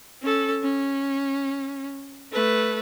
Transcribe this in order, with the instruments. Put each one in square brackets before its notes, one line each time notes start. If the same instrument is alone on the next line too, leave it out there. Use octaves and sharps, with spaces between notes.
[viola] C#4 A4
C#4
A3 B4